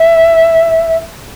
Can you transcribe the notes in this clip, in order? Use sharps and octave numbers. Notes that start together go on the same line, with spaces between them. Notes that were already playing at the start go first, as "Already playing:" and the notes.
Already playing: E5